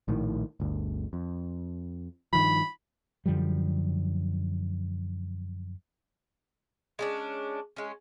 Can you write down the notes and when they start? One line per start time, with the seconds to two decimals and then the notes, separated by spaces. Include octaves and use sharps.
0.08 A#1 A2 D#3
0.60 G1 D2
1.13 F2
2.33 G2 D#3 F3 B5
3.26 F#2 D3 F3 G3
6.99 G#3 C#4 D4
7.76 G#3 C#4